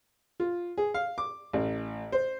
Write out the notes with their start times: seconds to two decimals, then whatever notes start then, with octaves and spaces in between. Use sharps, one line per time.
0.40 F4
0.78 G#4
0.94 F5
1.18 D6
1.53 A1
2.12 C5